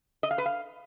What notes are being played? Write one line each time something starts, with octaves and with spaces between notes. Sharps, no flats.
D#5
F5
B4
F5